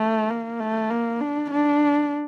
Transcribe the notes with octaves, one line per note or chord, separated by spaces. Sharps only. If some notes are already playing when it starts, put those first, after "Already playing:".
Already playing: A3
A#3
A3
A#3
D4
D4